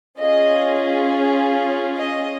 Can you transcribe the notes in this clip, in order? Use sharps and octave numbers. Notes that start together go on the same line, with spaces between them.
C#4 F4 G#4 D#5
D#5